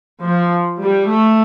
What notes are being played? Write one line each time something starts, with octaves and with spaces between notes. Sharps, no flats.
F3
G3
A3